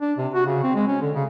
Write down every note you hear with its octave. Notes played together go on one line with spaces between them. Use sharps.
D4
C3
F#4
C#3
C4
G#3
C#4
D3
C#3